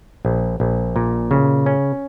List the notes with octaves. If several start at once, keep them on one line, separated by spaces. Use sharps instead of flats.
A#1
A#1
A#2
C#3
C#4